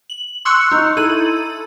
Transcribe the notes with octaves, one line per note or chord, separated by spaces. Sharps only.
F#7
C6 C#6 E6 F#6 C#7
D#4
E4 A4 D#7 F#7